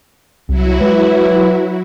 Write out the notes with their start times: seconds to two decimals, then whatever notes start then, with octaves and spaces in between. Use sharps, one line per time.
0.49 C2 F#3 E4 F#4
0.81 E3 G#3